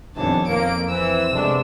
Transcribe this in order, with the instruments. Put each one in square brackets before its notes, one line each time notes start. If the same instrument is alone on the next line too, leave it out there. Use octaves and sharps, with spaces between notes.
[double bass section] F2 B2 D#3 [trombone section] E3 G3 D4 [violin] C#5 A5
[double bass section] F2 [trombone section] A#3 [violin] D7
[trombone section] E3 [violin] C4 E6
[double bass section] C3 G#3 [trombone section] A3 B3 D4